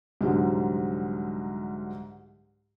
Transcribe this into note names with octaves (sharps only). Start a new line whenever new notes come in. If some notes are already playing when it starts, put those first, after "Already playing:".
C2 G#2 D3 F#3